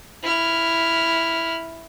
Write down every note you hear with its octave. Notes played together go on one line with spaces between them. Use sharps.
E4 F6